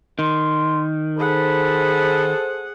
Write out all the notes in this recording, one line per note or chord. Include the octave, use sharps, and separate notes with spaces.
D#3 C6
G#4 A4 C5 F#5 B5